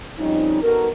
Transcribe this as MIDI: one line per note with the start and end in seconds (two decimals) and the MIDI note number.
0.18 0.62 41
0.18 0.62 53
0.18 0.62 55
0.18 0.62 60
0.18 0.62 61
0.18 0.62 63
0.63 0.88 59
0.63 0.88 63
0.63 0.88 66
0.63 0.88 69
0.63 0.88 70